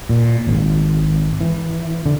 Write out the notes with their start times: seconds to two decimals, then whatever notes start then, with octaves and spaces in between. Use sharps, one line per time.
0.09 A#2
0.47 G#1
1.41 E3
2.06 D3